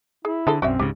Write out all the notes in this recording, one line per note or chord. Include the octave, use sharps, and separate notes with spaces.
E4 G#4
D3 C4 G#4 A4
B1 F#2 C4 F#4 D5 E5
C#2 G#2 C#3 G4